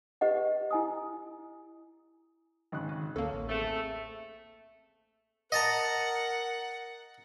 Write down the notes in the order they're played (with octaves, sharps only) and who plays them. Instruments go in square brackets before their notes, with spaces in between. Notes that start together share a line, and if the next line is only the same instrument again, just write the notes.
[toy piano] G4 B4 D#5 F#5
E4 G#5 D#6
[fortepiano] G#1 C#3 F#6
[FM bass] D#3
[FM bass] D2 [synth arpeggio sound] A#3 A4 [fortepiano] C#4
[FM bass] A1
[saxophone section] A3 [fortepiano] C4 G#4
[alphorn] A#4 [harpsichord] D#5 A5 A#5 [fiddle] F#5